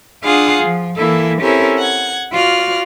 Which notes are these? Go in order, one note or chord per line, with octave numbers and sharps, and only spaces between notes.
D4 F4 G#4 F5 F#5 D#6
F3
E3 A#3 E4 A4
C4 C#4 E4 G4 A4 A#4
F#5 G#6
F4 F#4 D5 F6